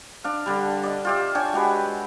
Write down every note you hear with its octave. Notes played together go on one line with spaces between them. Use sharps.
D4 F5
D3 G3
D5 D#5
F4 G4 E5
D4 C#5 G5 G#5
G#3 F#4 G4 B4